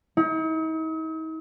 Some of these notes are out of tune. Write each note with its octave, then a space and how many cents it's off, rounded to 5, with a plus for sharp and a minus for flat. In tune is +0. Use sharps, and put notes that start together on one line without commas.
D#4 +45